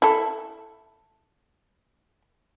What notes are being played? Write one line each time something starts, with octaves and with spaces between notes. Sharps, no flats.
E4 A4